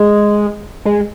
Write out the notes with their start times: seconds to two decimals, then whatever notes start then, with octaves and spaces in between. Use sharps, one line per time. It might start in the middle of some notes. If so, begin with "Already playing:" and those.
Already playing: G#3
0.85 G#3